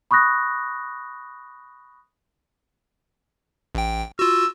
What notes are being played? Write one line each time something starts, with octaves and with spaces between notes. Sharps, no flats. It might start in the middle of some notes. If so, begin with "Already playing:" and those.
B5 C#6 D#6 F#6 A#6
A1 G5
F4 F#4 E6